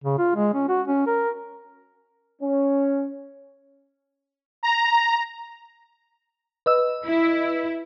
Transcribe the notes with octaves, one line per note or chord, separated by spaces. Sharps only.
C#3
F4
G#3
C#4
F#4
C#4
A#4
C#4
A#5
B4 D#5 E6
E4